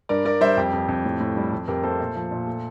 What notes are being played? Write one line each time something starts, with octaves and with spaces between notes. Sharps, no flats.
G2 A#4 D5
G2 A#4 D5
G3 C5 E5
F2 G4
F2
F2
A2
A2
G3
F2
F2 G4 A#4
A3 A4 C5
A#2
F3
A#2
A3